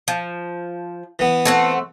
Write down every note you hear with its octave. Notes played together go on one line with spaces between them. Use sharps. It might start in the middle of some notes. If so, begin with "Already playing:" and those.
F3
E3 B3
A3 C4 F#5